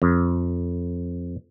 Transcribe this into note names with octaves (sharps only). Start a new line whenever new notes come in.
F2